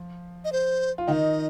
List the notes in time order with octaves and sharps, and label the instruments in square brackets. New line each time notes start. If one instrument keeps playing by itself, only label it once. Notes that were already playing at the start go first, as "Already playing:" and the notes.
Already playing: [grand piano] F3
[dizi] D#5
C5
[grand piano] F4
[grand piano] D#3 D#4 [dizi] D#5 G5